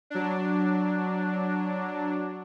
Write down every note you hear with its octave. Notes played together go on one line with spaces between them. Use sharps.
F#3 D4